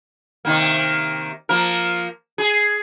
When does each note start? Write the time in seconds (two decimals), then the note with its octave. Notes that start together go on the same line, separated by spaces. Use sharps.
0.45 C3 D#3 A#3
1.49 F3 A#3 A#4
2.38 G#4